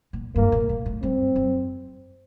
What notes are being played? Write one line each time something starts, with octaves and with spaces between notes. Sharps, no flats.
A#2
G2 A#3
A#2
A#2
A2
G2 C4
F#2